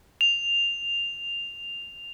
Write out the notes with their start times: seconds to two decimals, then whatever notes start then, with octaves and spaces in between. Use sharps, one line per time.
0.21 F7